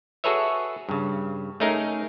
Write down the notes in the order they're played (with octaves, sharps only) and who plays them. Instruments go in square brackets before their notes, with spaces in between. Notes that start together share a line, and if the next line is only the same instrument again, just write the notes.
[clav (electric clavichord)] F#4 G#4 A4 B4 C#5 E5
G2 C#3
A3 C#4 D#4 G#4 A#4